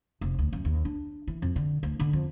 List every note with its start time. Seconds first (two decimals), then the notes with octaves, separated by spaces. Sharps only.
0.21 F1
0.39 D2
0.53 F#2
0.65 D#2
0.85 D4
1.27 E3
1.42 F2
1.56 D3
1.83 D2
2.00 D3
2.13 F2